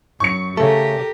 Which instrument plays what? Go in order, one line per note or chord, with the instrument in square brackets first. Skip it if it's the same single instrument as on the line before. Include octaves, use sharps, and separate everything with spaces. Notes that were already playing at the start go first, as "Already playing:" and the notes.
[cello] F#2 [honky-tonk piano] C#6 C#7
[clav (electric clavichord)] C#3 A3 [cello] G4 A#4 [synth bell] A4